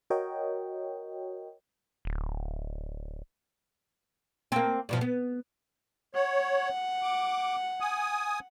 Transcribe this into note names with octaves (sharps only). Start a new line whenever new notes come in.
F#4 A#4 C#5 D#5 G5
D1
A#3 C4
G2 B2 F3
B3
C#5 F#5
D6
G#5 D#6